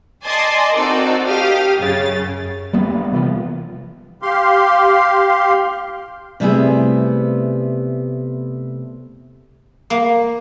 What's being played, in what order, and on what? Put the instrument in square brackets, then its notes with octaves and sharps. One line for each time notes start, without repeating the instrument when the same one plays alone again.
[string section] D5 D#5 G#5 A5 C6
C4 D#4 F#4 A4 A#4 D5
G4 F5 D#6 F6
F#2 C#3 A6
[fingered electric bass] G3 A#3 B3
C3 E3 F3
[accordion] G4 F5 C6
[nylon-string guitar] C3 G3 A3 B3 E4 G#4
[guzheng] A#3